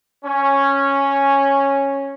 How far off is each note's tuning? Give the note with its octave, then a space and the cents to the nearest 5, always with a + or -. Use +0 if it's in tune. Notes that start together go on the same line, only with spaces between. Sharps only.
C#4 -5